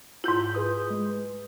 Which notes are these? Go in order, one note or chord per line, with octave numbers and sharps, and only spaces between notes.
G#2 E4 F4 G6
G#4 B4 D#6
G#3